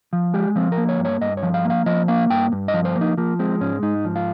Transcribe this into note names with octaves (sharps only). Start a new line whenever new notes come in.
F3
G#3 G4
F3 C4
A#4
A#3
C#5
G2
C#5
G2 D#5
C#5
F3
F5
A#3
F5
F3 D#5
A#3 F5
G2 G5
G2
D#5
F3
C5
A#3
D#4
F3 A#3
G#3 C4
G#2 C#4
G#2 D#4
F3
F4